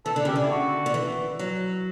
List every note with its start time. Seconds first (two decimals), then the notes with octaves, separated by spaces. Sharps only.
0.06 E3 A4
0.16 D3
0.25 C#3 G4
0.36 D3
0.43 E4
0.50 F#4
0.86 D3
0.94 E3
1.39 F#3